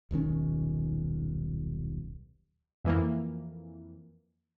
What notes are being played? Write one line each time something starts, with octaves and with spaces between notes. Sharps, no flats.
D#1 B1 D#3 C#4
F2 E3 A#3